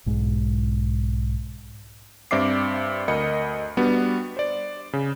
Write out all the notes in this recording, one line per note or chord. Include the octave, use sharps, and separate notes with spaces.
B1 G#2
G2 C4 D5 E5 D6 C7
D2 A#4 D#5 B5 C#7
G3 B3 D4 F#4
C5 D5
C#3